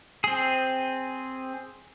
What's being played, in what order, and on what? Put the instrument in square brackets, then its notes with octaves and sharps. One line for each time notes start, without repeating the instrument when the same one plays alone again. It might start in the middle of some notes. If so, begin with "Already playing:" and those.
[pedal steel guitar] C4 G#4